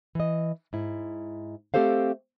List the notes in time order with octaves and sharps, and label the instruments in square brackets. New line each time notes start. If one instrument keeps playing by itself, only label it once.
[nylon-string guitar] E3 D#5
G#2 E4
A3 C4 G4 A4 C5 F5